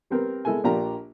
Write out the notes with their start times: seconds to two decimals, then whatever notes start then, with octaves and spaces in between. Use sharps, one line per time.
0.10 G3 B3 C4 A#4
0.45 G#3 E4 A4 A#4 G#5
0.64 A#1 A#3 D4 F4 G4 A#5